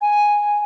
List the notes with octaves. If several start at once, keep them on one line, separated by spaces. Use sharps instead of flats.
G#5